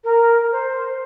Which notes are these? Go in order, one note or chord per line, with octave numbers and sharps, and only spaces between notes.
A#4
C5